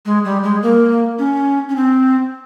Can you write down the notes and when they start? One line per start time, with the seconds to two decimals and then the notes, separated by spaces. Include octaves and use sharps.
0.06 G#3
0.25 G3
0.43 G#3
0.63 A#3
1.19 C#4
1.69 C#4
1.76 C4